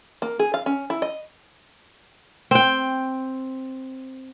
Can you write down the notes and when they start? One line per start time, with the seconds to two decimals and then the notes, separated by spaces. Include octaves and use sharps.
0.22 A#3
0.39 G#4
0.54 F5
0.66 C#4
0.90 E4
1.02 D#5
2.51 C4 G5